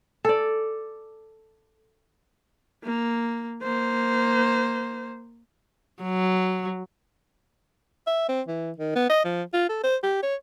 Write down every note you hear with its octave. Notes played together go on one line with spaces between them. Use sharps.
A4 D5
A#3
A#3 C5
F#3
E5
C4
E3
D#3
B3
D#5
F3
F4
A4
C5
G4
C#5